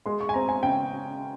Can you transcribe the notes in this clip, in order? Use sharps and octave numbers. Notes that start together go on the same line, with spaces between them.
G#3 C6
C#6
G#5
C4 A#5
G#5
C#3 G5